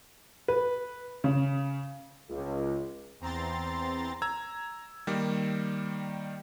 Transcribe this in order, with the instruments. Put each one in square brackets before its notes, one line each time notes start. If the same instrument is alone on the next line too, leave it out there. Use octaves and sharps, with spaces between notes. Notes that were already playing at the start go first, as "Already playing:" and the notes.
[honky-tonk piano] B4
C#3
[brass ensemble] C#2
[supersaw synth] E2 C4 A#5 C6 A6
[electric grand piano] A#5 E6 G#6
D#3 G3 A#3